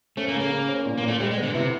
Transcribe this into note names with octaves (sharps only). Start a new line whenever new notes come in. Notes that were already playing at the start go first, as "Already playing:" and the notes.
A3 C#4
A#3
C#3
A#3
C#3
C#4
A#2
A#3
A#2
A3
G3 G#3
G#3
B3
D3
B2
C3 E4